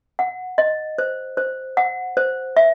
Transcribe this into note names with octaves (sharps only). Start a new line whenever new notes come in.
F#5
D#5
C5
C5
F#5
C5
E5